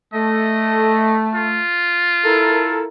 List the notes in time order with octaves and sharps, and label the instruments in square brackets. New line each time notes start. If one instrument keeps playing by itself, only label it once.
[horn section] A3 [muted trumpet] D#5
[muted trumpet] F4
[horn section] E4 A4 A#4